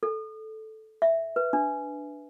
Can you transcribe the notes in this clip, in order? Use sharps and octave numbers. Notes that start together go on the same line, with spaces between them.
A4
E5
B4
D4